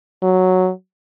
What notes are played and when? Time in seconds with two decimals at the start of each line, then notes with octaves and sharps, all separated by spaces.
0.22 F#3